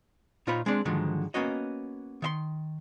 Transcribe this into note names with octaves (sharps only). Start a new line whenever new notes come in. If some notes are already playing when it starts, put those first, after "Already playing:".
A#2 D#4 F4 C5 C#5 B5
G#3 C4 D4 D5
G#2 D3 D#3 F3 F#3 G#3
A#3 B3 C#4 F#4 C#5 D#5
D#3 E5 C6